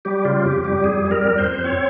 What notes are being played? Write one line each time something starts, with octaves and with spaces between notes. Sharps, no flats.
G3 G4
C#3 F4
F2 G4
G3 G4
F2 G#4
G3 G#4
A#4
F2
C5
F2
C4 C#5